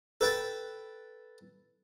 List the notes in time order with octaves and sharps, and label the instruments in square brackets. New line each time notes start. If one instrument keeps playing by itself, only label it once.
[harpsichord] A4 B4 G5 A5